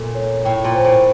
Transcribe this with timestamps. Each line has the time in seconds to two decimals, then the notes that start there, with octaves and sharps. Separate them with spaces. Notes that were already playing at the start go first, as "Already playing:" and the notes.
Already playing: A#2 A4
0.15 C#5
0.45 A2 G5
0.64 A#2
0.74 C5
0.84 A2